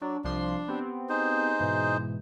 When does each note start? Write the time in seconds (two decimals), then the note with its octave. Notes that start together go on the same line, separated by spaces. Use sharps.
0.01 F#3 D4
0.24 C2 F3 D4 C6
0.68 B3 C4 G4
1.09 D#4 G#4 C5
1.59 G#2 B2 E3